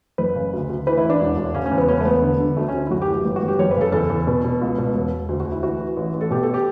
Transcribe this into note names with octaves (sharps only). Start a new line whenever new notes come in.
F#1 B4
C#3
D2
D2
E3 B4
E4
A1
D4
E1
E1
C#3 C#4
C#4
E2
B3
E1 C#4
A3
E1 B3
D3
D3
D2 A3
C#4
D2
E4
F#1 F#4
G4
E3
G4
G1
F#4
G1
G4
F#1 C#5
B4
C#3 A4
E2 A4
E2
B2
B2
C#2
B2
E1
E1
D2
F#4
D2
E4
E3 F#4
E3
A1
A1
A4
B2 G4
A4
G4